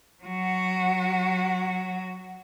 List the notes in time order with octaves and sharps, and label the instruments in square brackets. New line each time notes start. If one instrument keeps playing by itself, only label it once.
[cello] F#3 F#4